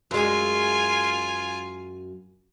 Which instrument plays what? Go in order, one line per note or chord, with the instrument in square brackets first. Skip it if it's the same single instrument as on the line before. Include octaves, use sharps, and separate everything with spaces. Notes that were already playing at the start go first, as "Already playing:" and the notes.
[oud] F#2 G#3 [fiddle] F4 G#5